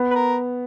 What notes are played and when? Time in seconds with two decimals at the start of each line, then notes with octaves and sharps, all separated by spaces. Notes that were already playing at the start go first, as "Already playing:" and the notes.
Already playing: B3
0.11 B4
0.15 A#4